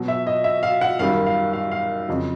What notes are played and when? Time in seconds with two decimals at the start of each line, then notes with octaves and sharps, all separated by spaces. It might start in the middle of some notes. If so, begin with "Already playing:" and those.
Already playing: B2 F#3
0.08 E5
0.27 D#5
0.44 E5
0.63 F5
0.81 F#5
0.99 F#2 D#3 G3 F5
1.26 F5
1.53 F5
1.72 F5
2.08 F2 C#3 F#3 D#5